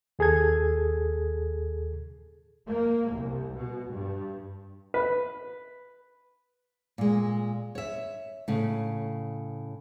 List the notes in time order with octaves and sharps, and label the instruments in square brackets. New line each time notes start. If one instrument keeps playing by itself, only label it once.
[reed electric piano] D#2 G#4 A4 G#6
[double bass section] A#3
C2
B2
G2
[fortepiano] B4
[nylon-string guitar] A#2 G#3
C#5 E5
A2 C#3